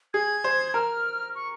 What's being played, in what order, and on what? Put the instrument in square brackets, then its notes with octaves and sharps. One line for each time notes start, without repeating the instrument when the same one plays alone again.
[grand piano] G#4 [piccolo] G#6
[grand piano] C5
[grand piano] A#4 [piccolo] F6
[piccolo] C#6